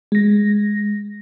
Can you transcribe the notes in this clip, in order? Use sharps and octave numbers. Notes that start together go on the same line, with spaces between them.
G#3 A#6